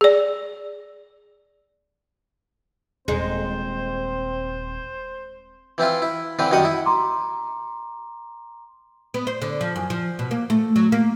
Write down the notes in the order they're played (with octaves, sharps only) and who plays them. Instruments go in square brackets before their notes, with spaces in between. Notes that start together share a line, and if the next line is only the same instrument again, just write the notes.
[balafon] G#4 D5
[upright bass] D#1 [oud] G#3 D#4 [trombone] C4 [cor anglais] C5
[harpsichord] E3 C4 E4 F4
E4
D3 E3 C4 B4
F#2 D#3 G3 D#5 F#5 D#6
E4
[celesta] A#5 C6 D6
[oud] B3
C5
D3
F3
F#2
F3
B2
A#3
A3
F#3
A#3